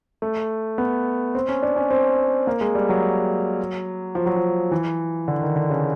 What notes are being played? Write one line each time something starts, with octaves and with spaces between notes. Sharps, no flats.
A3
B3
C4
C#4
D4
C#4
C4
A#3
G#3
G3
F#3
F3
F#3
F3
E3
D3
D#3
D3
C#3